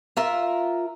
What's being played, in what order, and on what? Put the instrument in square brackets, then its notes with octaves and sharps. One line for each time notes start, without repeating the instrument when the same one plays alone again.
[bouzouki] F4 A#4 E5